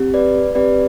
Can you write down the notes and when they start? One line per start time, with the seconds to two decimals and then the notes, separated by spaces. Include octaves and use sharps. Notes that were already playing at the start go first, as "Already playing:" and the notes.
Already playing: C4 G4
0.14 B4 D5
0.55 C4 G4 B4 D5